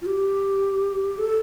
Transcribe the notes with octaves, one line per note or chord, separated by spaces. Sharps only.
F4
G4
A4